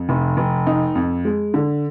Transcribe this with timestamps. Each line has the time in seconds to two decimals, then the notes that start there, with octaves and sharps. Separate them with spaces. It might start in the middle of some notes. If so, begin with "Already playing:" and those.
Already playing: F2
0.09 F1
0.37 F1
0.67 D#4
0.95 F2
1.25 G#3
1.54 D3